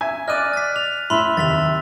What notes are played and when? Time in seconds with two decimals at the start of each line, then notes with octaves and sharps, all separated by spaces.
0.01 E5 G#5
0.28 D5 D#5 D6 F6 F#6 D#7
0.53 A6 B6
0.76 F7
1.10 A2 E4 E5 B5 C6 F7
1.37 D#2 C3 A6 B6 F7